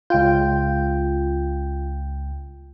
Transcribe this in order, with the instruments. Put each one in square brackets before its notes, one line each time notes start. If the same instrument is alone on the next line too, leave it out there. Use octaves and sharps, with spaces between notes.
[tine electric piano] C#2 G5 G6 [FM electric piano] F4